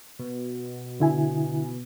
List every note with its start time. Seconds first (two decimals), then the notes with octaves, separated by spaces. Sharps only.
0.19 B2
1.00 D3 E4 G#5